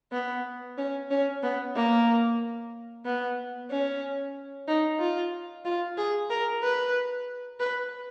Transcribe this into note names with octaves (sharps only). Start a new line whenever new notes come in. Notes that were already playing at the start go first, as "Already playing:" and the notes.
B3
C#4
C#4
B3
A#3
B3
C#4
D#4
F4
F4
G#4
A#4
B4
B4